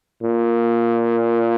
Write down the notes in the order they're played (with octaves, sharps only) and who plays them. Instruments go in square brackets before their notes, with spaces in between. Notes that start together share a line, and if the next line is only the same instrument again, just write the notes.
[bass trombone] A#2